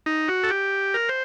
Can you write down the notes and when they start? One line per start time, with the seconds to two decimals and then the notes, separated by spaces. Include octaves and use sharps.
0.06 D#4
0.28 F#4
0.43 A4
0.50 G4
0.94 A#4
1.09 C5